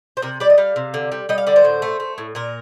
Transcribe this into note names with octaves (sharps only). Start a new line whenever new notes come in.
C5
C3 A#4
G3 D5
D#5
G3 F5
C3
D3
G3
G3 D#5
F5
D3 D5
C5
A2
A3
A3
A2
A#2 A#4